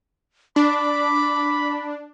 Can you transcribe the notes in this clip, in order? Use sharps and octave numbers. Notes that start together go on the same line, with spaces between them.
D4 B5 D6